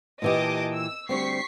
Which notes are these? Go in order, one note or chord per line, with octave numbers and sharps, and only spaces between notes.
A#2 E3 G4 D#5 A5 D6
E6
D2 G3 C4 C#6 B6 C7